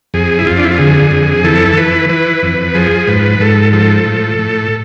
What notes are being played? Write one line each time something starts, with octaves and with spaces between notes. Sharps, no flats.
F2 G#4
E4
F2 F4
D4
E4
F4
D3 G#4
F2
E3 A4
E3 B4
E3 B4
F2
F3 G#4
G#2 B4
G#2 A4
F3 A4
A2
A2